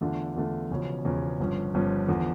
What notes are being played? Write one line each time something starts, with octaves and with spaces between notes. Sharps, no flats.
E2 D3 A3 D4 F4
E2 D3 A3 D4 F4
E1 E2 C#3 F3 C#4
E1 E2 C#3 F3 C#4
G1 G2 F3 C#4
G1 G2 F3 C#4
E2 D3 F3